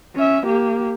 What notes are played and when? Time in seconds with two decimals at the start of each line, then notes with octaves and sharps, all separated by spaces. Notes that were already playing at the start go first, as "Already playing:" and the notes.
0.16 C#4 E5
0.46 A#3 G4